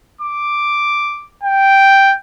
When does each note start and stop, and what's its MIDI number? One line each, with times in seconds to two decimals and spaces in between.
0.21 1.31 86
1.43 2.14 79